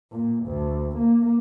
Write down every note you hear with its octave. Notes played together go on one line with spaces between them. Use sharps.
A#2
D2
A#3